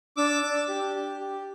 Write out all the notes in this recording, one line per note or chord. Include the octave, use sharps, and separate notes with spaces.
D4 D6 E6
D4
G4
G4
G4